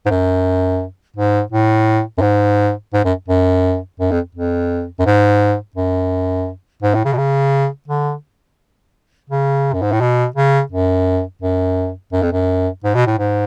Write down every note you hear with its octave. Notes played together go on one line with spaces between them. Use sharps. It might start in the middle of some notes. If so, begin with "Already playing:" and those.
G#2
F#2
G#2
A2
F#2
G#2
G#2
F#2
F#2
F#2
F2
F2
F#2
G#2
F#2
G#2
A2
C#3
B2
C#3
D3
C#3
F#2
G#2
A2
B2
C#3
F#2
F#2
F#2
F2
F#2
G#2
B2
A2
G#2